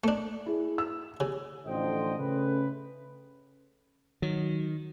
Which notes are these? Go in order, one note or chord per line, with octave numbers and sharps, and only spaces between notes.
A3 D4
E4 G#4
E6
C#3 G4
A1 F2 D3 C5 D#5 G5
C#3 A3 C#4 B4
D#3 F#3